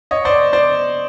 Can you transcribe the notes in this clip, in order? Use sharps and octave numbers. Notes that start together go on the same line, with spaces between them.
C#5 D#5
C5 D5
C5 D5